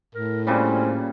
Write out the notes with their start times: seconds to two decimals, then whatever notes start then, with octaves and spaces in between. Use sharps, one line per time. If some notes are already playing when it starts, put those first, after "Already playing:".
0.15 A2 A#4
0.47 A#2 C#3 G3 C4 C#4